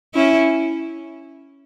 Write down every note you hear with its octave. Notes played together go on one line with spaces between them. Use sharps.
C#4 E4